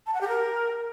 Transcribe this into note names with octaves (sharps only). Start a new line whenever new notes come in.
A5
F#5
G4
A#4